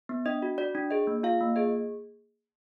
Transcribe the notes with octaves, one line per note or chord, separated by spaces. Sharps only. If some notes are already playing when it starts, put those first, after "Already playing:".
B3
D4 D#5
F#4
F#4 D5
D4
G#4 D#5
A#3
F4 F5
A#3
G#4 D#5